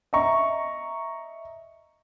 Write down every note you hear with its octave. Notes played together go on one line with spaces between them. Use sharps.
D#5 E5 A#5 C#6